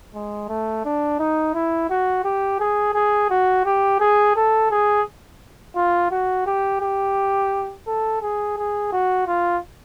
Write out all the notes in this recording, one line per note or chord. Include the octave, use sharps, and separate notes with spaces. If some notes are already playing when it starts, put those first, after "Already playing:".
G#3
A3
D4
D#4
E4
F#4
G4
G#4
G#4
F#4
G4
G#4
A4
G#4
F4
F#4
G4
G4
A4
G#4
G#4
F#4
F4